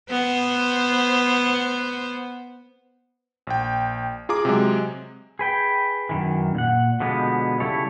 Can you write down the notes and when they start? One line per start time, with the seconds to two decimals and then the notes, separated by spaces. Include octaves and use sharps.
0.10 B3 C5
3.47 A#1 G5
4.29 F4 G#4 A#5 D6
4.45 C3 F#3 G#3
5.39 G#4 B4 G5
6.09 F#2 D#3 E3
6.55 A#2 F#5
7.00 B2 D3 F3 G#3 B3
7.60 C#3 G3 E4 A4 C#5